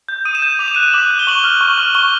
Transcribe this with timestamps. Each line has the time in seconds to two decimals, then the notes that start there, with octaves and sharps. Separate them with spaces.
0.09 G6
0.25 D#6 D#7
0.35 E7
0.42 G6 D#7
0.59 D6 F7
0.68 E7
0.75 F#6 D#7
0.83 E7
0.93 D6 F#7
1.11 F#6
1.19 G7
1.27 C#6 F#7
1.39 G7
1.44 F6
1.61 C#6
1.78 F6
1.95 C#6 G7